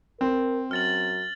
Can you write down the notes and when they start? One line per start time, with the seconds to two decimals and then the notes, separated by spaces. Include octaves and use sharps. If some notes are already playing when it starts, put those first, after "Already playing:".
0.21 C4 A#4
0.71 F#2 F6 A6 F#7